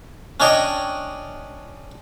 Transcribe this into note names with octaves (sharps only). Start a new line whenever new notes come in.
C#4 D4 C#5 D#5 G5